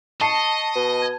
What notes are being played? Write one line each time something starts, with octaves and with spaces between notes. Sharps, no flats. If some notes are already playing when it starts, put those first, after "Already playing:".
D#5 A5 C#6 C7 C#7
B2
G#6